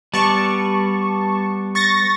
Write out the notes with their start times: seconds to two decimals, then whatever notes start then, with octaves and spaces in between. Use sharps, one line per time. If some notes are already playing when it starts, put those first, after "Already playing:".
0.14 G3 B3 D5 A5 C#6
1.75 C#6 A6 A#6